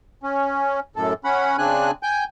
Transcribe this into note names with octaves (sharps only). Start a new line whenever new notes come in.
C#4
F#2 A2 A4
C#4 F#5 B5
C#3 C4 D4 G#5 F#6
G5 G#5 G6